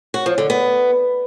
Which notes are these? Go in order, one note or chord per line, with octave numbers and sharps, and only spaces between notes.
F#4
F3
D3
B3